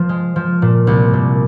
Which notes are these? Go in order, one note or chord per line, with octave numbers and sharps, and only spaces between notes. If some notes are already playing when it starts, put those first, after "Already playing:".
Already playing: F3
G#3
F3
A#2
C2
A#2